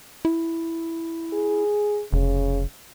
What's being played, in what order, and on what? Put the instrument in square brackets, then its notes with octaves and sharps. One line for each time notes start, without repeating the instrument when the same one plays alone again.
[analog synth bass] E4
[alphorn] G#4
[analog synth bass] F1 [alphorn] C#3